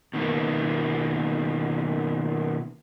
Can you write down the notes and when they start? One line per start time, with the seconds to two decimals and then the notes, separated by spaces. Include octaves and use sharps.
0.14 B2 D#3 A#3 B3